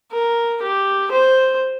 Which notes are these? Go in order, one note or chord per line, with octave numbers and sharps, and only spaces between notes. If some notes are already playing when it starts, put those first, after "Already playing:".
A#4
G4
C5